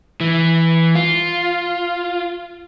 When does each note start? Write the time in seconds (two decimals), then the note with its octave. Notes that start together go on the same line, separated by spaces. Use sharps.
0.20 E3
0.95 F4